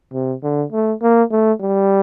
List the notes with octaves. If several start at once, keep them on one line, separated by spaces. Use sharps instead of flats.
C3
D3
A3
A#3
A3
G3